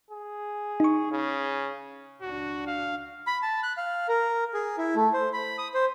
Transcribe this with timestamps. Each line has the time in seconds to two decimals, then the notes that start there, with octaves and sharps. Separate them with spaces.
0.11 G#4
0.80 D#4 C#6
1.11 C#3
2.22 C#2 D4 F#4
2.67 F5
3.27 B5
3.42 A5
3.63 F#6
3.77 F5
4.08 A#4
4.54 G#4
4.78 E4
4.95 A3
5.13 C5
5.33 B5
5.58 D#6
5.74 C5